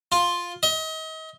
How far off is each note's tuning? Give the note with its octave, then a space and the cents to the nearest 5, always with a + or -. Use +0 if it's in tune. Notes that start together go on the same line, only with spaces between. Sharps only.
F4 +5
D#5 +35